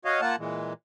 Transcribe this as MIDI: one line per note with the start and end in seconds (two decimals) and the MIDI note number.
0.05 0.21 66
0.05 0.21 73
0.05 0.21 75
0.05 0.21 77
0.21 0.36 58
0.21 0.36 65
0.21 0.36 78
0.21 0.36 81
0.38 0.73 46
0.38 0.73 52
0.38 0.73 56